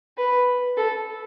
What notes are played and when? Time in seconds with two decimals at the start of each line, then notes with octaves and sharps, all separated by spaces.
0.18 B4
0.77 A4